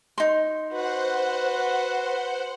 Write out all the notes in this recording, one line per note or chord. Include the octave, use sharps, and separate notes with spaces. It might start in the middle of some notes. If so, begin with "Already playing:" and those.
D#4 C6
F#4 B4 C5 F#5